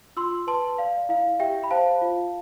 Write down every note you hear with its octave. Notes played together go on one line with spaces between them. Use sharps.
F4 C6 E6
B4 A5 C6
D5 F5
E4 F5
G4 E5 G5
B5
C5 F5 A5
F4